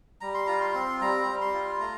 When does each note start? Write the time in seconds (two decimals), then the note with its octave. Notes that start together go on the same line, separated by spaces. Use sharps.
0.21 G3 A#5
0.34 C6
0.47 F4 A#5
0.61 C6
0.74 C4
1.01 G3 A#5
1.27 G3
1.41 C6
1.53 F4
1.80 A3 A#5